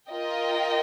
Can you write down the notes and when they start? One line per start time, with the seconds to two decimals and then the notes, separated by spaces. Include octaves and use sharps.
0.11 F4 A#4 D#5 G5